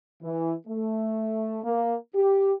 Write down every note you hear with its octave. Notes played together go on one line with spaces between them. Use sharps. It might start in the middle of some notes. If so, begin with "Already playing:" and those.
E3
A3
A#3
G4